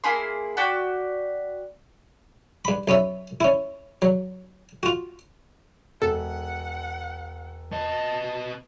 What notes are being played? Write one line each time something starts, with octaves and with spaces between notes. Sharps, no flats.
A#3 E4 G#4 C6
F#4 D5 G5 B5
G2 B5
B1 B3 C#4 E5
C#4 E4
F#3
F4 F#4
E1 A4 F#5
B3 D#5 A5